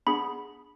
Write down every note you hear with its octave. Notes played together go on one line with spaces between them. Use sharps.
B3 D4 G#4 B5